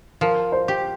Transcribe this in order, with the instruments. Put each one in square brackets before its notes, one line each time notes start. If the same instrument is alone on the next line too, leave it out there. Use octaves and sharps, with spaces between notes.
[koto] F3 [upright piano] A#4
[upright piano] C5
[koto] G4